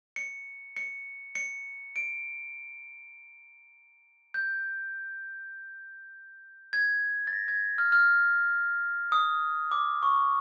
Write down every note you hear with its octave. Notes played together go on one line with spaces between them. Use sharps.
C#7
C#7
C#7
D7
G6
G#6
A6
A#6
G#6
F6
F6
D#6
D6
C#6